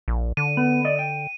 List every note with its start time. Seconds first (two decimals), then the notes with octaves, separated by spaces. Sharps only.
0.08 A#1
0.37 D3 D#7
0.57 B3
0.85 D5 D#5
0.99 G5